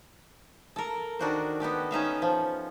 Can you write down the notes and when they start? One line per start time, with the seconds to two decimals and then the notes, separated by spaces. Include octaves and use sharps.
0.76 A4 A#4
1.19 D#3 D4 F#4 C5
1.60 B3 F#4 G4 A4
1.91 C#4 D#4 E5 F5
2.22 F3